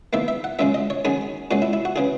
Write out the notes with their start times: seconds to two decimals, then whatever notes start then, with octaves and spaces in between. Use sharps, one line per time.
0.13 E2 D#3 A#3 E5
0.28 E5
0.44 F#5
0.59 F#2 C#3 G#3 E5
0.74 D#5
0.90 C#5
1.05 F#2 D#3 F#3 C#4 G#4
1.51 A#2 G#3 C#4 F#4
1.62 E4
1.73 E4
1.85 F#4
1.96 C#3 E3 G#4